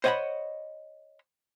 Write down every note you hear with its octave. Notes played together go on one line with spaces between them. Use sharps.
C5 C#5 D#5 F5 F#5 B5